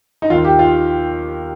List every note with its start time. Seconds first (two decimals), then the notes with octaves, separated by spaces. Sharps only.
0.22 D#4
0.30 D#2 D#3 F4
0.44 G4
0.59 F4